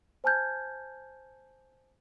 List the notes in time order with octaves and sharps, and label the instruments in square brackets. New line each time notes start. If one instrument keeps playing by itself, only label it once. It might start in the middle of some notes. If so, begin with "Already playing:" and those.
[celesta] C5 G#5 A5 F6 G6 G#6